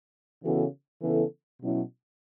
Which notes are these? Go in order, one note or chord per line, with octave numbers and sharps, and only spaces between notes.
C#3 E3 B3 F#4 A4
C#3 E3 B3 E4 A4
B2 F#3 C#4 E4